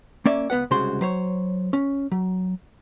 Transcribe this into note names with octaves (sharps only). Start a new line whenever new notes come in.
A#3 C#4 D5 E5
C#2 B3 B4 F#5
C2 C#3 G#3 F#4 C5 C6
F#3 C5 C#5
C#4
F#3